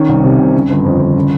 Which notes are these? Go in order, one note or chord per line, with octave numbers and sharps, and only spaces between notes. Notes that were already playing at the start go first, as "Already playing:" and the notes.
Already playing: D#3 C#4
C2
C3
C2
C#3
G1
F2
G1
C#3